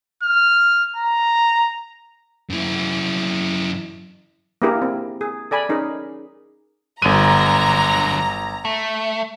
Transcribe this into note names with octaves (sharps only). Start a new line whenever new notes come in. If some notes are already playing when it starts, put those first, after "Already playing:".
F6
A#5
F#2 E4
A#3 D4 E4 G4 G#4 A#4
C4
G#4
A4 D5 G#5 B5
C#4 D#4 G#4 A#4
G1 D3 F#3 A#5 D#7
A3